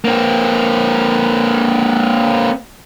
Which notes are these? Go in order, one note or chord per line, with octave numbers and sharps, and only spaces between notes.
A#3 C4